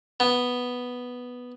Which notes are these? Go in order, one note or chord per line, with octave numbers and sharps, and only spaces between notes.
B3